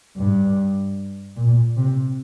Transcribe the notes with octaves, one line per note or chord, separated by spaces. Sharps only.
G2
A#2
C3